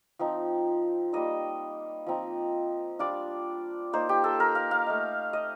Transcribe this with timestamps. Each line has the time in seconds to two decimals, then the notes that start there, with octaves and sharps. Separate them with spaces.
0.19 F3 C4 D#4
1.13 G3 A#3 D#4 D#5
2.07 F3 C4 D#4
2.99 G3 D4 F4 D5
3.93 A#3 D#4 C5
4.09 G4
4.24 A4
4.40 A#4
4.55 F5
4.71 F5
4.86 A3 D#4
5.33 D#5